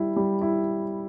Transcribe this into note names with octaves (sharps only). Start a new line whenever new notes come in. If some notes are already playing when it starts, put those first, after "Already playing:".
Already playing: G3 E4
G3
E4